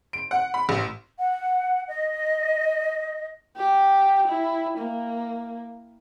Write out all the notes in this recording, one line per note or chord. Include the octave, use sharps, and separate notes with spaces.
D7
F#5
B5
A1
F#5
D#5
G4
E4
A#3